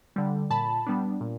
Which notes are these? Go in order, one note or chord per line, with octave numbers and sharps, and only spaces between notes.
D3 G3
A#2 A5 B5
G3 B3 D4
A#2